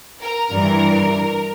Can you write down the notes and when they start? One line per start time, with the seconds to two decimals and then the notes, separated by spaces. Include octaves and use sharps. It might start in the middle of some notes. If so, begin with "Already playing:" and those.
0.21 A#4
0.51 G2 E3